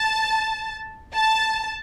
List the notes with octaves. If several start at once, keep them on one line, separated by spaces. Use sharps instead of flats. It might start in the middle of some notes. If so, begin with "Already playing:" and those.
Already playing: A5
A5